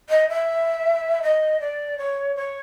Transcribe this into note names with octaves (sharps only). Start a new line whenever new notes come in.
D#5
E5
D#5
D5
C#5
C#5